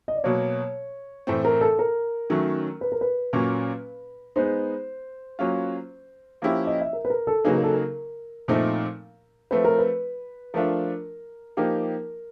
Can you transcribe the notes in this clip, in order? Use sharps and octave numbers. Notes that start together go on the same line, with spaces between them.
D#5
D5
B2 F#3 A#3 C#5
A2 E3 A3 C4
A#4
A4
A#4
D#3 F#3 A3 C#4
B4
A#4
B4
A#2 F#3 A#3 C#4
G#3 B3 D#4 C5
F#3 A#3 C#4 F4
F3 A#3 C#4 E4 G4
D#5
E5
A#4
B4
A#4
A4
C#3 F#3 A#3 D#4 G#4 B4
A#4
A4
A#4
A#2 F3 A3 C4 D#4
F3 A3 C4 B4
A#4
B4
F3 A3 D4 F4 A#4
F3 A#3 D#4 G4 A#4